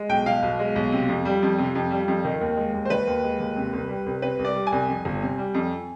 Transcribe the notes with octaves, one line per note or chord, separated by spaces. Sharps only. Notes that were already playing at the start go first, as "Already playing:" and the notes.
Already playing: G#3
B1 G5
B2 F5
B1
G#3
B1
C3
F2
G3
F2
C3
F2
G3
F2
D#3
D#2
G#3
D#2
C5
D#3 B4
D#2
G#3
D#2
C3
C2
G3
C2
C3 B4
C2
D5
G3
G#5
C2
F2
G1
C3
G3
F2